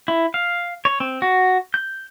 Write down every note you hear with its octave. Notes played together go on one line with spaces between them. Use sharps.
E4
F5
C#5
C4
F#4
G6